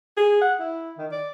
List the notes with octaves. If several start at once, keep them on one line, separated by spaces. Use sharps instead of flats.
G#4
F#5
E4
D#3
D5